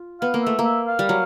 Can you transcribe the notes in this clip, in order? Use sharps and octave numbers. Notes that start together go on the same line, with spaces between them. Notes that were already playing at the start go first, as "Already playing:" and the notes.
Already playing: F4
B3 F5
A#3
A3 E5
A#3
E5
F5
G3
F#3